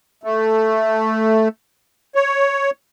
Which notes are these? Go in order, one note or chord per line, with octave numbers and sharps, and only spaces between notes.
A3
C#5